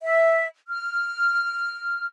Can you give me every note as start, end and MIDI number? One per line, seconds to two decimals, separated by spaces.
0.02 0.44 76
0.69 2.05 89